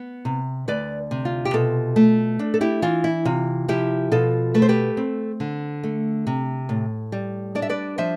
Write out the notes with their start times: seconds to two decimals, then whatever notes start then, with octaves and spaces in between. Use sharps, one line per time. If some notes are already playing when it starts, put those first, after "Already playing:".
Already playing: B3
0.25 C3
0.68 D2 B4 D5
1.11 C3
1.25 F4
1.45 G4
1.53 B2 F4 A4
1.96 A3
2.39 D4
2.54 A4
2.61 E4 G4
2.82 E3 F4
3.04 E4
3.25 C3 F4
3.68 F3 E4 G4
4.12 B2 F4 A4
4.54 A3 B4
4.62 C5
4.69 G4 B4
4.97 C4
5.40 D3
5.83 A3
6.27 C3
6.69 A2
7.12 G3
7.55 D4 D5
7.62 E5
7.69 B4 D5
7.98 F3 C5 E5